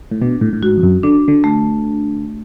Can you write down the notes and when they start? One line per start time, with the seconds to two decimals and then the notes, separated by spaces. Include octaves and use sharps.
0.11 A2
0.22 B2 D4
0.41 A2
0.53 A2
0.62 G#2 F#4
0.77 F2
0.83 F#2
1.03 D3 D4
1.28 D3
1.44 A3